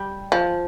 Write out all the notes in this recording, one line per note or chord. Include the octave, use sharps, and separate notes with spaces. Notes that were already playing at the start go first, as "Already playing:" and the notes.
Already playing: G3
F3